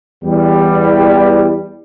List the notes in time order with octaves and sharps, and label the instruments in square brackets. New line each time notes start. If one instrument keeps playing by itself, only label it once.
[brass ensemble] E2 G3